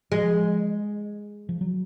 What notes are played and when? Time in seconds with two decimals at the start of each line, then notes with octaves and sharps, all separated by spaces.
0.12 F3 G#3
1.49 F3
1.61 F#3